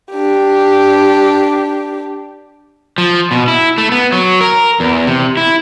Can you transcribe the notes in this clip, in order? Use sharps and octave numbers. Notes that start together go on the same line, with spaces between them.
D4 G4
F3
B2
E4
A3
B3
F#3
A#4
E2
C3
E4